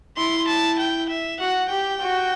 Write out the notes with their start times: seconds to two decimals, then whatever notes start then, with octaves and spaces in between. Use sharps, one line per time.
0.17 E4 C6
0.47 A5
0.78 G5
1.09 E5
1.39 F#4 F#5
1.69 G4 G5
2.00 F#4